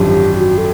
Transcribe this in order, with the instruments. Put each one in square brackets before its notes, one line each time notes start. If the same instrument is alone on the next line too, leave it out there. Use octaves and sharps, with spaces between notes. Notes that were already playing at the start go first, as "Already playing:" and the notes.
Already playing: [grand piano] G#1 F#2 D3 F3 [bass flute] G4
[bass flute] F#4
A4